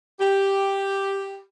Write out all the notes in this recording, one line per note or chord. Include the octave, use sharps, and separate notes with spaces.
G4